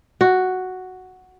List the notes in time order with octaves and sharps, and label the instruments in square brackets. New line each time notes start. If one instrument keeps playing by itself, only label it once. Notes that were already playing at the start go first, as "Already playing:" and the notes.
[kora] F#4